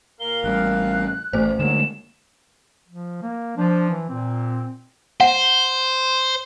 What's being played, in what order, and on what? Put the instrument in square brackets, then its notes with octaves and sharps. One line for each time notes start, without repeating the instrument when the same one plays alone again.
[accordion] A#2 A#4 F5 [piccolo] G7
[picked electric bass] A1 G3 [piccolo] F#6
[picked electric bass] A1 [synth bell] A3 C5
[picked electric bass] D3 G#3 A#3 [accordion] F#3 [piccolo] E7
[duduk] F3
A#3
[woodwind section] F3 [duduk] D4
[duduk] E3
[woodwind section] A#2 [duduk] C4
[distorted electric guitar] C5 [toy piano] F#5